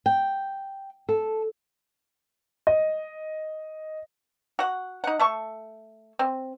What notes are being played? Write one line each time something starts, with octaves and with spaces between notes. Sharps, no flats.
G5
A4
D#5
F#4 F#5
D#4 F#5
A3 A4 C#6
C4